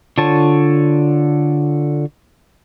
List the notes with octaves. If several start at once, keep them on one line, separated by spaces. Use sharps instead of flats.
D3 F4 C#5 A5